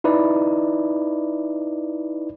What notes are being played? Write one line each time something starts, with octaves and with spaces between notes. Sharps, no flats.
D#4 E4 B4 D5